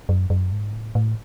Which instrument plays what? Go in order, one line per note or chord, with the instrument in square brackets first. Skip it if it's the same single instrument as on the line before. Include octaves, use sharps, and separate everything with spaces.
[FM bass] F#2
F#2
G#2
A2
A2